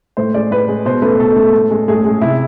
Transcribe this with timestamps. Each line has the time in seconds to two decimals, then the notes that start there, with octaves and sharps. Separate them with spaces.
0.17 A2 C5
0.34 G#3 D5
0.51 A2 B4
0.69 G#3
0.85 B2 C5
1.02 A3 B4
1.19 B2 A4
1.36 A3
1.53 A2
1.71 G#3
1.88 A2 G#4
2.04 G#3 G#4
2.21 C3 E4